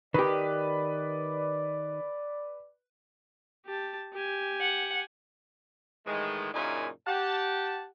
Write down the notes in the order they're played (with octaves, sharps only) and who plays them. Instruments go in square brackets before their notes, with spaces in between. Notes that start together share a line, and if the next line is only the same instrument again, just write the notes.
[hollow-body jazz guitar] D#3 G4 [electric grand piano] B4 [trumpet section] D5
[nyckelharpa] G4 A5
G4 G#5
[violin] F#5
[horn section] A2 D#3 E3 G#3
F#2 A#2 C#3 D#4 E4 G#5
G4 F#5 A5